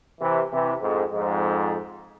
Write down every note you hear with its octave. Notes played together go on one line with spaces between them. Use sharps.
C3 E3
C3 E3
F2 G#2
F2 G#2